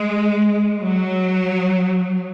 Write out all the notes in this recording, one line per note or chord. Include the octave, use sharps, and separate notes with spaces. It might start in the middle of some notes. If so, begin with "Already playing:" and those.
Already playing: G#3
F#3